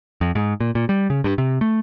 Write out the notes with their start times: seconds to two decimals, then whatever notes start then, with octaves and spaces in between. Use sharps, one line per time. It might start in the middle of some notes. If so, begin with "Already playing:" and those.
0.21 F2
0.35 G#2
0.60 A#2
0.75 A#2
0.89 G3
1.10 C#3
1.24 G2
1.38 C3
1.61 A3